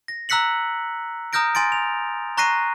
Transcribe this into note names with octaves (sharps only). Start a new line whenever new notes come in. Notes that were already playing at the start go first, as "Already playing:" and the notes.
A#6
A#5 E6 F#6 B6 C#7 F#7
A#5 D#6 F6 G6 A#6 D7
G#5 C6 A6 D7
F7
A#5 C#6 F#6 A#6 C7 D#7